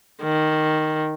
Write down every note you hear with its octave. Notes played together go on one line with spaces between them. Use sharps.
D#3